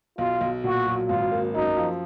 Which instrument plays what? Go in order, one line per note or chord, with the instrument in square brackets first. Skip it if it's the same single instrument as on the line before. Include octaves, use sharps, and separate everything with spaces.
[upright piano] B1 [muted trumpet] F4
[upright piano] B1
[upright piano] A#2 [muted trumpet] F#4
[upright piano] F#3
[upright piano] G#1 [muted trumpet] F4
[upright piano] A#3
[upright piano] F#2 [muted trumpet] D#4
[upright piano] F3